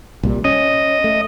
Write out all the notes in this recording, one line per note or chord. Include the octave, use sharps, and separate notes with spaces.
C2 A#2 G3
C#4 D#5
A3